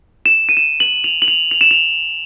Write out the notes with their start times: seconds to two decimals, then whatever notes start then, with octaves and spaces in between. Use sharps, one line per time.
0.26 E7
0.49 D#7
0.57 E7
0.80 F#7
1.04 F7
1.22 F#7
1.28 F7
1.51 F7
1.61 E7
1.71 F7